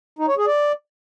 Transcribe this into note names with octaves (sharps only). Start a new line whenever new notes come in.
D#4
C#5
G#4
D5